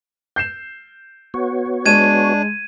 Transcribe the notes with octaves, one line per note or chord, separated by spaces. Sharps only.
G6 C7 E7
B3 F#4 C#5
G#3 D4 G#6 D#7 E7